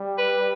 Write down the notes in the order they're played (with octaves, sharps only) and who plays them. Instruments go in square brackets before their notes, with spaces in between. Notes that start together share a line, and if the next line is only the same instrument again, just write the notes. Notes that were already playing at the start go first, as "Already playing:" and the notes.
Already playing: [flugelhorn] G3
[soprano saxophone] B4